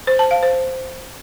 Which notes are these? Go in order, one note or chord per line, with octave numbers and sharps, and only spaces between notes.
C5
A5
F5
C5